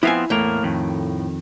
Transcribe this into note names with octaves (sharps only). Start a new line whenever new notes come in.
F3 B3 C4 E4 F5 G#5
E2 A2 A#3 A#4
F2 D#3